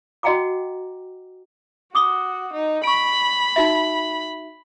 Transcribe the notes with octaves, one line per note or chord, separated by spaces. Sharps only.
F#4 D#5 F#5 G5 A#5 D6
F#4 D6 D#6 G7
D#4
B5 C#6 D7
D#4 F#4 E5